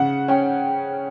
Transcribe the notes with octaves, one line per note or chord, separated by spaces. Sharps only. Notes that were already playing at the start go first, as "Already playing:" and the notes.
Already playing: C#3 F#5
C#4 G5